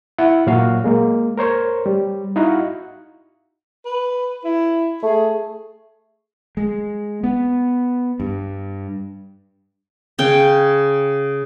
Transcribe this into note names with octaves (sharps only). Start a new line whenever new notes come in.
E4 E5 F#5
A#2 F#3 F#4 F5
G#3 A#3
A#4 C5 C#5
G3
D#4 E4 F#4 F5 F#5
B4
E4
A3 G#4
G#3
B3
G2
C#3 G5